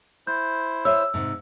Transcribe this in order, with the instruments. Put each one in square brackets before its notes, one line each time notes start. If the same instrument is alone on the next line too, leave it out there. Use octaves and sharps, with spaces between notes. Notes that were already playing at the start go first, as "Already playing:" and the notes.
[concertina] E4 C5 [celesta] G6
[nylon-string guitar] C#5 E5 [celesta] E6
[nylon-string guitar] G#2 C3